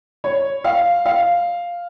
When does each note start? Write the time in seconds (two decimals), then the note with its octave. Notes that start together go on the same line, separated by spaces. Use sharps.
0.24 C#5
0.64 F5
1.05 F5